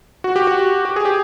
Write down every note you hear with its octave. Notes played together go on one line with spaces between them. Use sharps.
F#4
G4
F#4
G4
G#4
G4